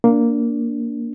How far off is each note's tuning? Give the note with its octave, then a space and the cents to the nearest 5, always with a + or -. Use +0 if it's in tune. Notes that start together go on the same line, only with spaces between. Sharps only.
A#3 +0 D4 -15